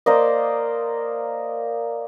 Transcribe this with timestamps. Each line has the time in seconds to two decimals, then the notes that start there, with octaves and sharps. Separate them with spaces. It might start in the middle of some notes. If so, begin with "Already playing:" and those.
0.06 A#3 C5 D5 D#5